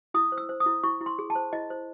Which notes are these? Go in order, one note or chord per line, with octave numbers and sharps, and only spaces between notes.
E4 D#6
C5
E6
C5
D#6
E4
E4 C#6
E4
C6
G#4
A5
C5
E4 D#5
C5